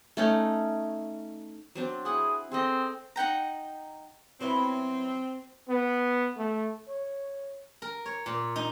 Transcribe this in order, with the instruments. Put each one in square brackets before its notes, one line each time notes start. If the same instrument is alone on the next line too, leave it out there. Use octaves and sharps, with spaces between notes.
[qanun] A3 C#4 D#4
F#3 C4 D4
[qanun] E4 F#5 [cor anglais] G#4
[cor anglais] C4 [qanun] G#4 A4 D#5
[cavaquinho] D#4 F#5 G5 A#5
[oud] F#3 B3 E4 [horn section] C4
[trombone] B3
A3
C#5
[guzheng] A#4
C#5
A#2
D#4